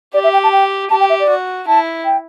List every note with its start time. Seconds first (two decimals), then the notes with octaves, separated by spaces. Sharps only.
0.14 G4 D5
0.24 E5
0.33 G5
0.43 A5
0.53 G5
0.90 G4 A5
1.00 G5
1.10 E5
1.20 D5
1.29 F#4
1.67 E4 A5
2.05 G5